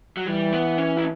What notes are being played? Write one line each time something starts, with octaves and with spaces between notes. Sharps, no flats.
F#3
E3 G3
B3
C#4
E4